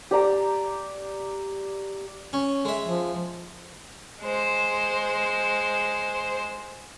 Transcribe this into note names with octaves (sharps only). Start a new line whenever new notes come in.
G4 D5 A#5
C#4
G#3 E5
F3
G#3 C5